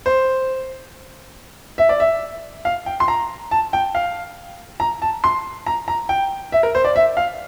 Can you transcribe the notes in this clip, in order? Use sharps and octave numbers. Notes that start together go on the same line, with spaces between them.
C5
E5
D5
E5
F5
G5
C6
A#5
A5
G5
F5
A#5
A5
C6
A#5
A#5
G5
E5
A#4
C5
D5
E5
F5